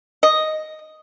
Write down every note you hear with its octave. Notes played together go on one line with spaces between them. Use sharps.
D#5